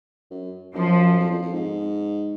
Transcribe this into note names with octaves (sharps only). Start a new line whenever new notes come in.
F#2
F#2 F3
F2
F2
F2
G#2